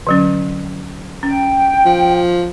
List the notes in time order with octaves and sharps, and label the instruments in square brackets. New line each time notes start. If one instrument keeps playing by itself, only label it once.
[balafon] D3 F#3 C#4
[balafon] C#4 [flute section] G5
[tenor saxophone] F3